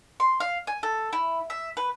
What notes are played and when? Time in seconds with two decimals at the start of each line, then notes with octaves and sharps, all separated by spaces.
0.20 C6
0.40 F5
0.67 G#5
0.83 A4
1.13 E4
1.50 E5
1.77 B4